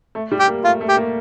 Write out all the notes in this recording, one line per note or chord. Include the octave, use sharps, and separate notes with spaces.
A3
G3
G4
A#3
A3 F4
A3
G4
A#3